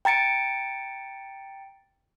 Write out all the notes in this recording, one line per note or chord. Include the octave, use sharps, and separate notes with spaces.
G5 A#5 A6 C#7 D7